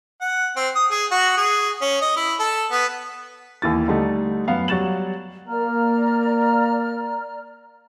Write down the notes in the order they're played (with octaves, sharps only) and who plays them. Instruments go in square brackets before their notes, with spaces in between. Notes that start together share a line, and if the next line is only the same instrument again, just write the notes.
[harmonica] F#5
C4
D#6
G#4
F#4
G#4
C#4
D#5
E4
A4
B3
[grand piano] D#2 E3 A6
D3 G3 A3 D#4
F#2 B3 F5
F#3 G3 F#4 A6 E7 F#7
[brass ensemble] A#3 [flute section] D5 A#5 F6